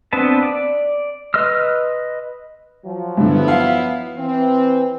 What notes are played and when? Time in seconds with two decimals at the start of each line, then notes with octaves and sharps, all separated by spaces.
0.13 B3 C4 D4 B4 A5
0.43 D5
1.34 B4 D#5 C6 E6 F6
2.84 F3 F#3
3.17 G2 D3 B3 E4
3.48 F5
4.17 E3 C4